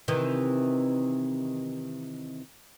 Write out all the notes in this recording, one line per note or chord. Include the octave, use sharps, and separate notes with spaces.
C3 D#3 E3